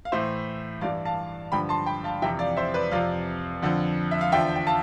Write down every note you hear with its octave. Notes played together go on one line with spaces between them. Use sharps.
F5
A2 E3 C5 E5
G2 E3 D5 F5
F5 A5
G2 D3 F3 G5 B5
A5 C6
G5 B5
F5 A5
F2 C3 E3 E5 G5
D5 F5
C5 E5
B4 D5
F2 C3 F3 D5 F5
F2 D3 F3
E5
F5
E2 D3 F3 E5 G5
G5
F5 A5